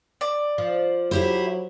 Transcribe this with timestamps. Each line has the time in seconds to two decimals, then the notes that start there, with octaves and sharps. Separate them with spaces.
0.21 D5
0.58 F3
1.11 F#3 E4 G4 C5